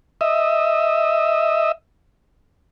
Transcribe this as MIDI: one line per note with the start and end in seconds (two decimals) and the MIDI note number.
0.21 1.72 75
0.21 1.72 76